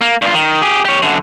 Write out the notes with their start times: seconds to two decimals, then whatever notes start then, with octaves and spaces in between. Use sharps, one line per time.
0.01 A#3
0.22 G2 F4
0.34 D#3
0.62 G4 G#4
0.85 G4 C#5
1.02 F#2 D3